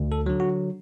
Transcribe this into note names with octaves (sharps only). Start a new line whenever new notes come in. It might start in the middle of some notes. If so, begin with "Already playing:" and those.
Already playing: D2
A4
D3 F#3
F#4